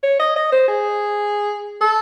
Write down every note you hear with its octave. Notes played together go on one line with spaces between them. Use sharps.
C#5
D#5
D#5
C5
G#4
A4